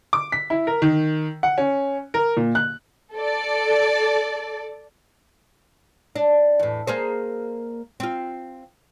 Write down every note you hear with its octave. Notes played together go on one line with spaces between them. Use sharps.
D6
B6
E4
A#4
D#3
F#5
C#4
A#4
A#2
F#6
A4 D5
D4
E2 A2
A#3 G#4 C5
C4 F4